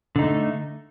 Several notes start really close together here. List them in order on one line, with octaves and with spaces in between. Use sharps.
D3 D#4 A3